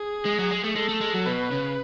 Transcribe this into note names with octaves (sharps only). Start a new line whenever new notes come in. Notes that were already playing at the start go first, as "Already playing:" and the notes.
Already playing: G#4
G#3
F#3
G#3
A3
G#3 A4
A3
G#3
F#3
B2 B4
C#3